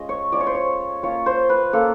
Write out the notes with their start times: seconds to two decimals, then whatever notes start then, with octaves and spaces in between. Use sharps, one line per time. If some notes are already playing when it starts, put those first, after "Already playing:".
Already playing: G#3 C#4 F4 D#5
0.09 C#5
0.32 G#3 C#4 F4 D5
0.40 C#5
0.47 C5
0.55 C#5
1.03 A#3 C#4 F4 C#5
1.26 C5
1.49 B4
1.73 A#3 C#4 F4 A4